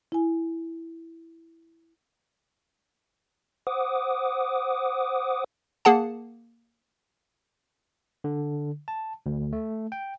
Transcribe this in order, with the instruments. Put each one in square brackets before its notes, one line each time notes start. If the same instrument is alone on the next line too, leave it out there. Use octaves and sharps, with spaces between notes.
[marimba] E4 G#5
[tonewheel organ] C5 F#5 D6 D#6
[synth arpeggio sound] A#3 G#4 F#5 A5
[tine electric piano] D3
A5
D2
A3
G5